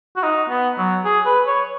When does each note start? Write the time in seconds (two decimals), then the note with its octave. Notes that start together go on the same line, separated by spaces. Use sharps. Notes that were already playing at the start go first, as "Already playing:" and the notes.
0.16 F#4
0.23 D#4
0.49 B3
0.78 F#3
1.04 G#4
1.26 B4
1.46 C#5